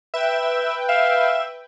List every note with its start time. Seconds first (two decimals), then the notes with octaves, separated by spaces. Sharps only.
0.14 B4 E5 G5
0.89 E5 F5